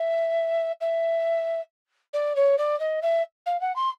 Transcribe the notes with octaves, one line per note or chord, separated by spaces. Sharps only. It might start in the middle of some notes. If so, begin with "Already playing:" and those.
Already playing: E5
E5
D5
C#5
D5
D#5
E5
F5
F#5
C6